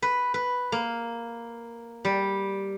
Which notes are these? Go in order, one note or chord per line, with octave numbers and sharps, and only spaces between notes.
B4
B4
A#3
G3